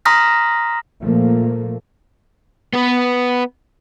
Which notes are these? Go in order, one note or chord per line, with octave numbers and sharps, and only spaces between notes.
A#5 C6 D#6 F6 A#6 B6
A#2 F3 A3 A#3
B3 B4